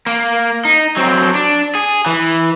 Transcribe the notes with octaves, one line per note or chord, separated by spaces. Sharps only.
A#3
D#4
F#3 C4
D4
G#4
E3